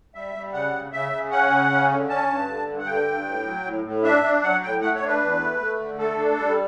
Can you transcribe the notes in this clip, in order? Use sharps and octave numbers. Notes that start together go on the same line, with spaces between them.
G3 E5
G3
C#3 F#5
C#3
C#3 E5
C#3
C#4 F#5
C#3
C#4
D3
C#4 A5
G2
D3
G2
F#5
D3 G5
G2
A2
F#3
A2
A2
D4 E5
D4
F#3 F#5
A2 G5
A3 F#5
C#5
D4
B4
E2
A3
A3
D3
A3 A4
D4
G3